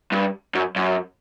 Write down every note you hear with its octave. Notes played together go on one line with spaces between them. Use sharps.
G2
F#2
F#2